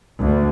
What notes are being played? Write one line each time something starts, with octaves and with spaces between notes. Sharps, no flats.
D2